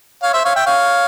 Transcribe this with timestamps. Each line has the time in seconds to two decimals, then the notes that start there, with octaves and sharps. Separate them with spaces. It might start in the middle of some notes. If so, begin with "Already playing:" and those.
0.23 C#5 F5
0.33 C5 E5
0.44 C#5 F5
0.55 E5 G5
0.66 C#5 F5